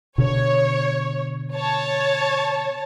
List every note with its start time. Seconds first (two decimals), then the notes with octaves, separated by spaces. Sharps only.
0.18 B2 D3 C#5
1.55 C#5 A5